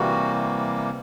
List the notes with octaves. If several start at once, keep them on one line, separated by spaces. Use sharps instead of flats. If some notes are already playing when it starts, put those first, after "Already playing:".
Already playing: C3 E3 G3 A#3 F#4